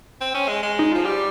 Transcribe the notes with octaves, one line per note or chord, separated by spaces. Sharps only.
C4
C#4
G#3
G#3
D#4
F3 F4
G3 G4